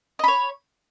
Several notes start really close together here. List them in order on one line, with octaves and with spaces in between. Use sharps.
D#5 B5 C#5